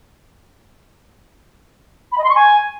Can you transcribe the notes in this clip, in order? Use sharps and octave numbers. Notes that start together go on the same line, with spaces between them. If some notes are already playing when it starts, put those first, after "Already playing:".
B5
D#5
C6
C#6
G#5